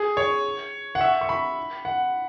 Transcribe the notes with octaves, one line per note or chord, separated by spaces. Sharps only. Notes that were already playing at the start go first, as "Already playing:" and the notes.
Already playing: G#4
C#5
F#5
E5
C#6
B5
F#5